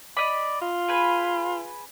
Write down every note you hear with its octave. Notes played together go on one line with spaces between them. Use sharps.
D5 D#5 B5
F4
G#4 B4